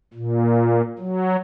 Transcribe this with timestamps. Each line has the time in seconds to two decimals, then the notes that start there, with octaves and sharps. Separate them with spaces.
0.14 A#2
0.99 F#3